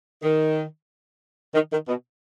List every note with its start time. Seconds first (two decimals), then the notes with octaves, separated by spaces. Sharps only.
0.23 D#3
1.54 D#3
1.71 D#3
1.88 B2